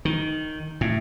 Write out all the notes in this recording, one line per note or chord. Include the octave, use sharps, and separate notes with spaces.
D#3
A2